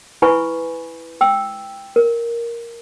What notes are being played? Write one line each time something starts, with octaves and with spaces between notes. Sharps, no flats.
E4 B4 G#5 B5 C#6
G5 E6
A#4